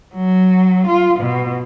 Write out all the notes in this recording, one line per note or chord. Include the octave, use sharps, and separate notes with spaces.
F#3
F4
B2